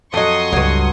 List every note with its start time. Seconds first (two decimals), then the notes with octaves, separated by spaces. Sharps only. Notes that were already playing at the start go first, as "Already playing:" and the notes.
0.14 F2 F#3 A4 D#5 C6 C#6 D#6
0.53 C#2 G2 F#3